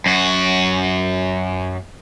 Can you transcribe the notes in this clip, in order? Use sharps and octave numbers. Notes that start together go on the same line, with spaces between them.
F#2 F#4